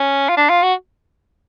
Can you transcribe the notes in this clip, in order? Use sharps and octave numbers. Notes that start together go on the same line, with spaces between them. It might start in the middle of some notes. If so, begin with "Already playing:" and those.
Already playing: C#4
F4
D4
F4
F#4